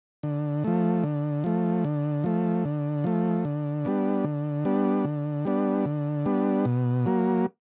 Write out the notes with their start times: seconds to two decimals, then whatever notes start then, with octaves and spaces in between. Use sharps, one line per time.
0.23 D3
0.64 F3 A3
1.04 D3
1.44 F3 A3
1.84 D3
2.24 F3 A3
2.65 D3
3.04 F3 A3
3.45 D3
3.85 G3 B3 D4
4.24 D3
4.65 G3 B3 D4
5.05 D3
5.45 G3 B3 D4
5.86 D3
6.26 G3 B3 D4
6.65 B2
7.06 F#3 A#3